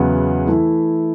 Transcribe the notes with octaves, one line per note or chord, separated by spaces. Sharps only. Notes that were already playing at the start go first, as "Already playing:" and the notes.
Already playing: E2 C#3 F#3 B3
E3 A3 E4